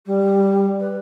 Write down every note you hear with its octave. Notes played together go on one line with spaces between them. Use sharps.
G3
B4